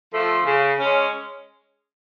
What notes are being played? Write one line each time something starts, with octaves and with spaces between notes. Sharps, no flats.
F3 A3 F4
C#3
G#3 C#4